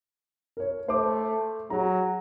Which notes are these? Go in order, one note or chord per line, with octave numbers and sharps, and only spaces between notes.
A#4 C#5
A3 C5 D6
F#3 G#4 A#5